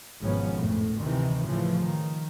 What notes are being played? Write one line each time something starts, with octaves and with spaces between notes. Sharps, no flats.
G#1 B2 F3 B3 C#4
F2 A2
D2 C3 D#3 E3
A2 C#3 E3 F3
D#3